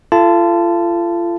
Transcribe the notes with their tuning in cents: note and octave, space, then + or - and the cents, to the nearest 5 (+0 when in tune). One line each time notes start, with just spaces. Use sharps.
F4 -35 A4 +0 A5 +0